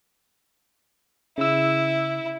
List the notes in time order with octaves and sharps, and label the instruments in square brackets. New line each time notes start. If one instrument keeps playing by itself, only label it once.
[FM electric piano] C#3 E6 [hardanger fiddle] E4